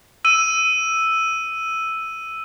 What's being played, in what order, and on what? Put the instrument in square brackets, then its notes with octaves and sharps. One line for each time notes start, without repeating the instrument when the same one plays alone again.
[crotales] E6 D#7